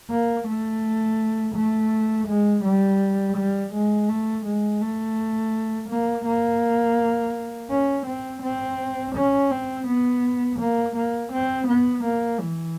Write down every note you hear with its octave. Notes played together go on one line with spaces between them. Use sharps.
A#3
A3
A3
G#3
G3
G3
G#3
A3
G#3
A3
A#3
A#3
C#4
C4
C4
C#4
C4
B3
A#3
A#3
C4
B3
A#3
E3